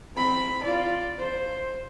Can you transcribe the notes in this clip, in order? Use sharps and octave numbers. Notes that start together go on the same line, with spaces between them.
C4 B5
F4 D5
C5